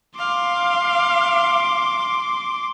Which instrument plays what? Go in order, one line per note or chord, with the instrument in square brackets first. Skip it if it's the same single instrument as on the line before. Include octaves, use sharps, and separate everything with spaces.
[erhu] F5 [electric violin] C6 D6